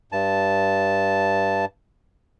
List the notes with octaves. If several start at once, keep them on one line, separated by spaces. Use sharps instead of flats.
G2 A5